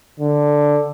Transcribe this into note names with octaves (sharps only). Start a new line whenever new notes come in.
D3